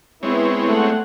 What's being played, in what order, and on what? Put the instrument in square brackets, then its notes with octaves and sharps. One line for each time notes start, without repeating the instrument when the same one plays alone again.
[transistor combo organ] G#3 C4 C#5 [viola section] B3 E4
[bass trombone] A3 [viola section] F#5